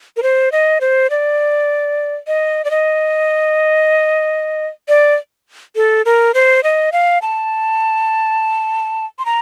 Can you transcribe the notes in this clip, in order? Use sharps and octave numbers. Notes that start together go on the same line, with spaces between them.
A#4
C5
D#5
C5
D5
D#5
D5
D#5
D5
A4
A#4
C5
D#5
F5
A5
C6
A#5